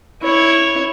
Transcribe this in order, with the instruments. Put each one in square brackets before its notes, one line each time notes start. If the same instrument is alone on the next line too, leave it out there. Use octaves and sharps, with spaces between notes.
[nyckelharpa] E4 C#5